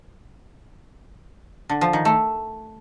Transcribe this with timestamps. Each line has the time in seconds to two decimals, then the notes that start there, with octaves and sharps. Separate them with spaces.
1.69 D3
1.81 F3
1.93 D#3
2.05 A3